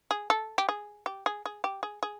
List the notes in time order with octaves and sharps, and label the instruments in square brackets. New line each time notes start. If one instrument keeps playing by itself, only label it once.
[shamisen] G#4
A4
G4
G#4
G4
G#4
G#4
G4
G#4
G#4